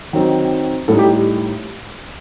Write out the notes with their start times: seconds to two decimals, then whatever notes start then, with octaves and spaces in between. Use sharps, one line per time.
0.13 D#3 F#3 C4 D#4
0.88 A2 G3 D#4 A4
0.99 G4